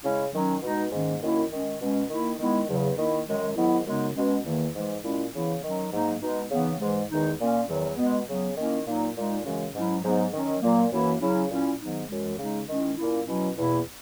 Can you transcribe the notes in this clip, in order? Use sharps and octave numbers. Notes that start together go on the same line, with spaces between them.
C#3 G#3 C#4 E4
D#3 F#3 C#4
B2 G#3 D#4
G#2 D#3 A#3 C#4
F#2 D#3 A#3 C#4 E4
D#3 G#3 C#4
B2 G#3 C#4
D#3 A#3 E4
D#3 G#3 B3 E4
E2 C#3 F#3 B3
D#3 A#3 E4
F#2 D#3 G#3
G#2 D#3 F#3 B3 E4
F#2 C#3 G#3 B3 D#4
B2 G#3 C#4
E2 D#3 A#3
G#2 E3 G#3
A#2 G#3 C#4 E4
C#3 E3 B3 E4
D#3 F#3 C#4
G#2 F#3 A#3 D#4
B2 G#3 D#4
C#3 E3 B3 D#4
G#2 E3 G#3
E2 D#3 G#3 D#4
A#2 A#3 C#4
E2 D#3 F#3
B2 G#3 B3
C#3 F#3 B3
D#3 A#3 C#4 E4
A#2 F#3 A#3 D#4
A#2 G#3 D#4
F#2 C#3 E3 G#3 C#4
G#2 F#3 C#4 E4
G#2 F#3 B3 D#4
D#3 F#3 C#4
A#2 F#3 A#3
F#2 E3 A#3 E4
C#3 F#3 C#4 E4
A#2 F#3 C#4 E4
G#2 D#3 F#3 B3 D#4
F#2 E3 G#3
C#3 G#3 D#4
D#3 G#3 C#4 E4
A#2 A#3 C#4 E4
B2 F#3 C#4 E4
E2 B2 A#3 E4